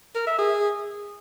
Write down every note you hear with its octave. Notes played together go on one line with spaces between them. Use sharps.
A#4
E5
G#4